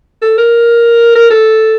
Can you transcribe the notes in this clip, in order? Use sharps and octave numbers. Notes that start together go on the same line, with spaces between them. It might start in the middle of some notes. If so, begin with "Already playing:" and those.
A4
A#4
A#4
A4